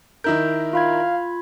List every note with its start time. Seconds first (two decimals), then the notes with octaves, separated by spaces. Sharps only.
0.24 D#3 E4 A#4 G6
0.73 F4 F5 B5 G#6